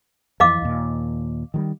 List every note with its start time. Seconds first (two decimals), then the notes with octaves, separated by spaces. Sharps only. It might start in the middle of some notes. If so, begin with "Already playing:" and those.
0.40 F2 E3 D#5 F5 D6
0.62 D#2 A#2
1.54 D#3 F3 G3